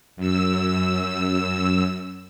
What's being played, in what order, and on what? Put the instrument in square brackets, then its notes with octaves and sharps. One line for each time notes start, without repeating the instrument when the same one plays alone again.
[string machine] F#2 E6